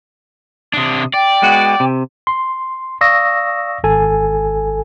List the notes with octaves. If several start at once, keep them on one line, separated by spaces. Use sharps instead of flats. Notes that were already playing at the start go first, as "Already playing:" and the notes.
C3 D4 D#6
D5 G5
G#3 B3 F#4
C3
C6
D5 F5 C#6 D#6 E6 A#6
G#1 A4 G#5